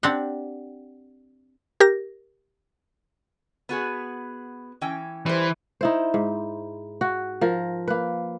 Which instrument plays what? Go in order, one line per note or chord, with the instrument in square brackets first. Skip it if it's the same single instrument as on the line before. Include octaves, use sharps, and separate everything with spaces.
[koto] C4 D4 G4 F#5
[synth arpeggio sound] G4 A#4 A#6
[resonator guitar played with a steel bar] B3 F#4 G#4
E3 C#4 G5
[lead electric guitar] E3 [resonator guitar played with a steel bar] G3 C5
[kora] D#4 E4 C5
G#2
F#4
F3 A#4
A#3 B4